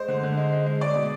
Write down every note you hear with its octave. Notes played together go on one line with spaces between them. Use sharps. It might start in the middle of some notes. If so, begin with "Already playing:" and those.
Already playing: G#3 C5
D3
D3
G#3
G#3
G#3
G#3 D5
B2